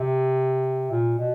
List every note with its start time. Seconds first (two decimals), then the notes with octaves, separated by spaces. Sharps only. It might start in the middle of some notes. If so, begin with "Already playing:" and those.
Already playing: C3
0.91 A#2
1.19 B2